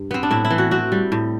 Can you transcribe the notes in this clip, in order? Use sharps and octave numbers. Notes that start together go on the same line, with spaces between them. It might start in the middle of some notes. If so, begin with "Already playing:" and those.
Already playing: G2
B3 C4
D4
A2 E4
E4
E3
F#4
C4 F#4
G3
A2